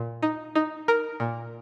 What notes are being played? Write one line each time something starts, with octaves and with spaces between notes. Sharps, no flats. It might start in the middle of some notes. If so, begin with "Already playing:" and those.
Already playing: A#2
D#4
D#4
A#4
A#2